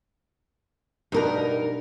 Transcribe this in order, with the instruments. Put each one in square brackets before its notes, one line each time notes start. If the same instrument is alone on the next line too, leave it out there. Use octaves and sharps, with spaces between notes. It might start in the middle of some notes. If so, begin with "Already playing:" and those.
[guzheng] G2 B2 B3 [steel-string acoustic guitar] D#4 A#4